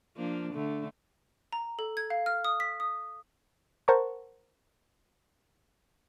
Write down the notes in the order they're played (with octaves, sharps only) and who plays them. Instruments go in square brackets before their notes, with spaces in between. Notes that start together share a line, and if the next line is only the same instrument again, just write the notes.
[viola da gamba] F3 A#3 D4
D3 A3
[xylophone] A#5
A4
G#6
F5
F6
D#6
B6
D#6
[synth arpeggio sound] A#4 C5 F#5 A5 A#5 C#6